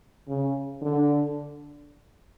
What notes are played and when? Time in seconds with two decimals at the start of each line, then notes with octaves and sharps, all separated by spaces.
0.28 C#3
0.82 D3